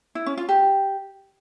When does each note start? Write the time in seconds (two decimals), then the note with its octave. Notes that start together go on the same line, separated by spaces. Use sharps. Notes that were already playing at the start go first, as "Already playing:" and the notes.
0.15 E4
0.26 C#4
0.37 F4
0.49 G4